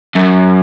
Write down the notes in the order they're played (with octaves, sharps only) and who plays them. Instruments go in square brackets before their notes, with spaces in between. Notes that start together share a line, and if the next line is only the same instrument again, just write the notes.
[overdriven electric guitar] F#2